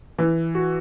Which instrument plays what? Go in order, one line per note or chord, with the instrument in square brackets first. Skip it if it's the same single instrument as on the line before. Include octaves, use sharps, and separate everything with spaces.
[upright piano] E3
F#4